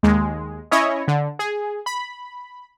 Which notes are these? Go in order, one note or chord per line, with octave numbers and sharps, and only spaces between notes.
D#2 G#3
C#4 E4 C#5 D#5
D3
G#4
B5